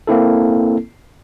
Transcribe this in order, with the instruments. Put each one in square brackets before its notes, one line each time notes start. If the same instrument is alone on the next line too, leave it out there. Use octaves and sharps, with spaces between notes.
[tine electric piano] A#3 C4 E4 A4